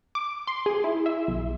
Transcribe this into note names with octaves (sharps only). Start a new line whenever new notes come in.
D6
C6
G#4
E4
E5
B1